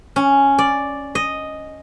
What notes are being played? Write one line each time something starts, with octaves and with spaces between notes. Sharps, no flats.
C#4
D5
D#5